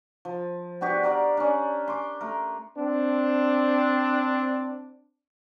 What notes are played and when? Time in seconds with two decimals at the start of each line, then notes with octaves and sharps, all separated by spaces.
0.25 F3
0.81 B3 D4 F#4 G4
1.03 G4 A#4 D5 F5
1.37 C#4 D4
1.88 C6 D6
2.21 A3 A#4
2.78 C4 D4